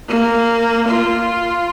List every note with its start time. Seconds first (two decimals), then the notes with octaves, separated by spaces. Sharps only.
0.08 A#3
0.88 F4